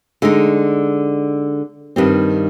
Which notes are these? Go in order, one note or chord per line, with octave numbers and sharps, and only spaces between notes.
D3 G#3 D#4
G2 D#3 G3 C4